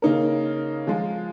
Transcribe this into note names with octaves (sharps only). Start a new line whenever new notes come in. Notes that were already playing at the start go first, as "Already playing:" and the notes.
C#3 A#3 D#4 A#4
F3 G#3 F4